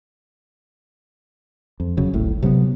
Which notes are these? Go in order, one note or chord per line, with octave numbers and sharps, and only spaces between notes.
F2
E1 C#3 F#3
D1 G#1 A2
C3 F#3 A#3 B3